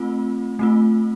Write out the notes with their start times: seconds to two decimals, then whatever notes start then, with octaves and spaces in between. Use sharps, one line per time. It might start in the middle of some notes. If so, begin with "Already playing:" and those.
Already playing: A3 C4 F4
0.59 A3 C4 F4